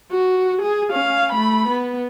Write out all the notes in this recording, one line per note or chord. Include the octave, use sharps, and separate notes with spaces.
F#4
G#4
C#4 F5
A3 B5
B3